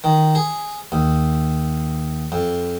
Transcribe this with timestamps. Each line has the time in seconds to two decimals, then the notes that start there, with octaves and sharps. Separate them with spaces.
0.04 D#3
0.35 G#4
0.92 D#2
2.32 F2